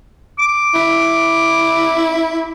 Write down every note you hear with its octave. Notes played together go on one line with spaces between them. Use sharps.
D6
E4